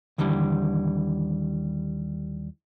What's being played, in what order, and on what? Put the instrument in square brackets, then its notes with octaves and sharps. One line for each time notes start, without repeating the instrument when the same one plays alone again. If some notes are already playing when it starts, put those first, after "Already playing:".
[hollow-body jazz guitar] D#2 D3 E3 G3